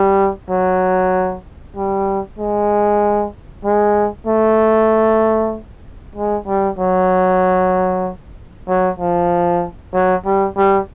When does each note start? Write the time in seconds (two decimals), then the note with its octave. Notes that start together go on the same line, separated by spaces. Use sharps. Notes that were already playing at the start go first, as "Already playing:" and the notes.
Already playing: G3
0.50 F#3
1.76 G3
2.39 G#3
3.65 G#3
4.27 A3
6.16 G#3
6.47 G3
6.78 F#3
8.68 F#3
9.00 F3
9.93 F#3
10.25 G3
10.57 G3